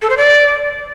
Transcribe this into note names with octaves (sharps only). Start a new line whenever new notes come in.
A4
C5
D5